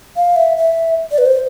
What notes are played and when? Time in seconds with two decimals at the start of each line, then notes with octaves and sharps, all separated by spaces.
0.16 F5
0.36 E5
0.57 E5
1.11 D5
1.18 B4
1.25 C5